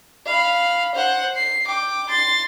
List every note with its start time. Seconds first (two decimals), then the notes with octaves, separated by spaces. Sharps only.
0.26 F5 B5
0.94 C5 F#5
1.36 C7
1.66 G5 D6
2.09 C6 A6